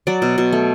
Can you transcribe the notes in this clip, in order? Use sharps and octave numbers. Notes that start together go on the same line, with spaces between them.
F#3 D5
B2
B2
A3